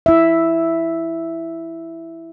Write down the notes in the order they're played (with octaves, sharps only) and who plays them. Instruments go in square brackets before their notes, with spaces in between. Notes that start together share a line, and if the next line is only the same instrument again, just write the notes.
[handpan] E4 E5